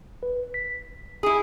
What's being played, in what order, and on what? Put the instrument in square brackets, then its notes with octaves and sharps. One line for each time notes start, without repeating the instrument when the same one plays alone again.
[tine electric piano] B4
B6
[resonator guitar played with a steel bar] E4 G#4